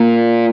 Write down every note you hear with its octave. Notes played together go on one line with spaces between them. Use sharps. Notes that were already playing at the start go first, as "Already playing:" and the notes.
Already playing: A#2